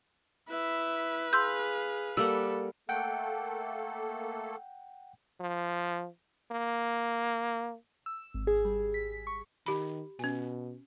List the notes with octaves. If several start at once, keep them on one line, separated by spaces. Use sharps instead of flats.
E4 B4 E5
G#4 F5 C6 E6 G6
G3 A#3 A4 F#5 E6
A3 A#3 A4 F#5 G5
F3
A#3
E6
G#1
G#4
G3
B6
C#6
D#3 G4 B5
B2 C#4 G#5